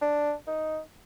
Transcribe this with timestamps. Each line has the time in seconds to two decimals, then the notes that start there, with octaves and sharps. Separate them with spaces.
0.02 D4
0.47 D#4